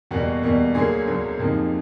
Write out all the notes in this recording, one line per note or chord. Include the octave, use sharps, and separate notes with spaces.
E2 B2 G3 A#3 F#4
E2 B2 G3 A#3
D2 D3 F#3 A#3 G#4
D2 D3 F#3 A#3
F2 C3 F3 A#3 D#4